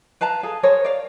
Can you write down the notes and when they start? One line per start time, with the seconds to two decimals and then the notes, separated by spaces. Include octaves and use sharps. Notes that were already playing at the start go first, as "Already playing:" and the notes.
0.21 B4 F5 A5 A#5
0.43 G#4 A4 F5
0.63 G#4 A#4 C5 C#5
0.84 D5 F5